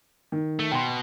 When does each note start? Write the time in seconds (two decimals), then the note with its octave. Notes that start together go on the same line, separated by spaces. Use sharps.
0.32 D#3
0.59 A3
0.72 B2 G5 C6